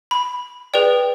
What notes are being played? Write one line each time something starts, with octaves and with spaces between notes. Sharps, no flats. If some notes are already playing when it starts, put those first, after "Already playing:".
B5
G#4 B4 D5 G5